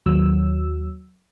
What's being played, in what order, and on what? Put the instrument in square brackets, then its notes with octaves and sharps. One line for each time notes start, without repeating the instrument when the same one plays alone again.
[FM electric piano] D#2 F#3 E6